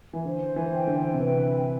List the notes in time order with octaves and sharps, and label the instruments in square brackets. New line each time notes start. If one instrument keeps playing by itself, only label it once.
[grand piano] E3
[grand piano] D3 [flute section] C5
[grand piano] E3
[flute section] G5
[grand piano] D3
C3
[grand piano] D3 [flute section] B4